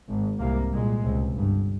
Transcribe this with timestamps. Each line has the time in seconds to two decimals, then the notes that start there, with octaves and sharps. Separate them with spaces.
0.08 G#1 G#2
0.40 C2 C3 A#3
0.72 C2 A#2 G#3
1.03 C#2 C3
1.35 G1 G2